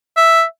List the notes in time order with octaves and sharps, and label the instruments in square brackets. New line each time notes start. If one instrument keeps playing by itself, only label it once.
[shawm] E5